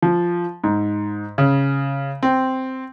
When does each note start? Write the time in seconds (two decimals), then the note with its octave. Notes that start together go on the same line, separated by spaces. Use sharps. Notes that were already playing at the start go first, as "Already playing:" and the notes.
0.02 F3
0.64 G#2
1.38 C#3
2.23 C4